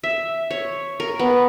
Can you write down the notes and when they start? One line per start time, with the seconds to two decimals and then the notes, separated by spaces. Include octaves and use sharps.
0.04 E5
0.51 C#5
1.00 A#4
1.19 B3